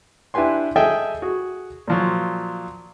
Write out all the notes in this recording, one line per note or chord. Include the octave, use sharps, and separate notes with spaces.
D4 E4 G4 B4 G#5 C6
G#4 A4 D#5 E5 G5 G#5
F#4 G#4
A#2 F3 F#3